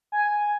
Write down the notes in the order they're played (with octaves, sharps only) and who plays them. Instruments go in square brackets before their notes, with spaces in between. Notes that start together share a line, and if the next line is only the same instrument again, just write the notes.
[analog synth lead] G#5